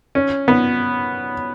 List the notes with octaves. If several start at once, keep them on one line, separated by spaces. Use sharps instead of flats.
C#4
B3